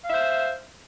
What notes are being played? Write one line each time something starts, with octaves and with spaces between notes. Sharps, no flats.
C5 E5 F5